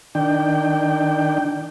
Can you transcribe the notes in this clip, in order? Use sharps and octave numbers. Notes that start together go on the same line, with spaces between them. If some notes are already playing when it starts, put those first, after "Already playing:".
D#3 D4 G5